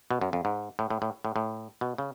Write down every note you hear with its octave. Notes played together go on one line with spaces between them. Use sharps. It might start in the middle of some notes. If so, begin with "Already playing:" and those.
B2
F#2
F2
G#2
A2
A2
A2
A2
A2
B2
C#3